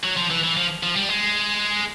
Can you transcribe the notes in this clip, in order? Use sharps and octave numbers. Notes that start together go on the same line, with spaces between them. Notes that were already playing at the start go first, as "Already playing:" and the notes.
F#3
F3
E3
E3
F3
F3
G3
G#3